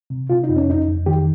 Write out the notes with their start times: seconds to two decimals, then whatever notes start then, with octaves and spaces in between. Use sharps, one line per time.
0.10 C3
0.30 C3 F4
0.44 D#4
0.49 F2
0.56 C#4
0.68 F2 D#4
0.88 F2
1.06 D#3 G4